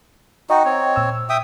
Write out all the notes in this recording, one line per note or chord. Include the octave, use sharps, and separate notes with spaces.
D#4 F#4 D#5 G5
C4 C#5
A#2 E6
E5 G5 D#6